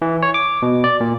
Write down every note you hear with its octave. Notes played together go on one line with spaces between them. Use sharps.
E3
C#5
D6
B2
D5
A#2